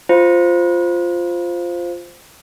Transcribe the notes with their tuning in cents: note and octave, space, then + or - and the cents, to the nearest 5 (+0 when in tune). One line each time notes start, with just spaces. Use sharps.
F4 +0 C5 +0 F5 +0